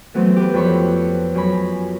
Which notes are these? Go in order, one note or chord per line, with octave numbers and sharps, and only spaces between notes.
E3 F#3 A3 B3 C4
G4 B4
F2 A4 C#5 B5 C#6
F#2 C#5 G#5 B5